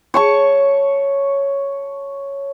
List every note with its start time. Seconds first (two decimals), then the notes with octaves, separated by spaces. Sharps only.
0.14 C#5 A5 C#6